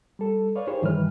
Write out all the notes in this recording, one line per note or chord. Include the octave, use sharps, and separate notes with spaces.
G3 A4
B4 C#5 D5 F5
D#4 G4 G#4 A#4 C5 C#5
G2 D#3 E3 G3 B4 F6